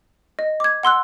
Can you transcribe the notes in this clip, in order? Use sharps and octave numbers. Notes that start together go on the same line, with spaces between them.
D#5
D6 G#6
F#5 C6 E6 F#6